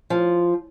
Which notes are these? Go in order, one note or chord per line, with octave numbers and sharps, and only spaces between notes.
F3